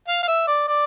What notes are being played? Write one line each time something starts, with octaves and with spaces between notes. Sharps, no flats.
F5
F5
E5
D5
D5